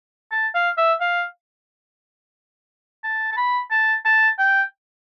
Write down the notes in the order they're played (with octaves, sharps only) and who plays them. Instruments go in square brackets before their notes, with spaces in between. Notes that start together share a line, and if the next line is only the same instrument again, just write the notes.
[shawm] A5
F5
E5
F5
A5
A5
B5
A5
A5
G5